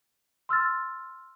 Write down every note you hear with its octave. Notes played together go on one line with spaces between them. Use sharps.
C6 E6 F6 A6